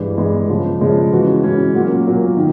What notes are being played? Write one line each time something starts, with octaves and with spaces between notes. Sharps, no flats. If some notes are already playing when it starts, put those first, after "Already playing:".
Already playing: G2 E3 G#3
G2 E3 G#3
C#3 F3 G#3
C#3 F3 G#3
E3 G#3 C#4 F#4
E3 G#3 C#4 F#4
A#2 F#3 A#3
A#2 F#3 A#3
D#3